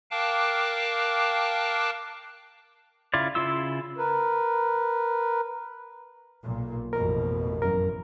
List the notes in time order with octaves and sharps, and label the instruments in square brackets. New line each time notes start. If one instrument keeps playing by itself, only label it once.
[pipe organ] A#4 F5 G5 A5 D6 F#6
[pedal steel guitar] C#3 E4 F4 D5
C#3 E4 F4 C6 E6
[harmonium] A#4 B4
[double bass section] B1 A#2
[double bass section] A1 F2 B2 [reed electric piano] A#4
[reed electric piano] F#2 F#3 A#4